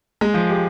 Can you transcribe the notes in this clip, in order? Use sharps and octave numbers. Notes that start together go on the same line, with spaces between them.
G#3
F3
G4